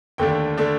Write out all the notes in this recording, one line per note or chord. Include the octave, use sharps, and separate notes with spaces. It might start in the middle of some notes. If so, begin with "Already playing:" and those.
D#2 D3 A3 D4 G5
D3 A3 D4